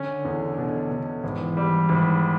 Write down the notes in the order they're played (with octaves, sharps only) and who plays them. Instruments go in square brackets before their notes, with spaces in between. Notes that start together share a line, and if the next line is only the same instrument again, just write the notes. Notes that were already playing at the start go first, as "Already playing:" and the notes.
Already playing: [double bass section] D3 [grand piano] C#4
[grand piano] E2
B2
B2
[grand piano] G#1 [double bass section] E3
[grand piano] G3
G#1